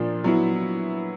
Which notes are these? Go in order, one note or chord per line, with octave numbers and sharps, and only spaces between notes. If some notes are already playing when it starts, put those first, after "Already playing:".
Already playing: A#2 F3 A#3 D4
F#3 B3 E4